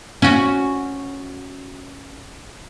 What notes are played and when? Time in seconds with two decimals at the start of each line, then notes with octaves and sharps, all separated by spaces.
0.22 C#4 F#4